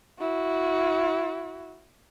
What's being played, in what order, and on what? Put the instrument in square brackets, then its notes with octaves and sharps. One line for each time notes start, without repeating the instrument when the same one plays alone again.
[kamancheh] E4 F#4